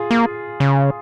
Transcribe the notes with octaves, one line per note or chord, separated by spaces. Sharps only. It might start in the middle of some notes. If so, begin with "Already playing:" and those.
Already playing: F4 G#4
A#3
C#3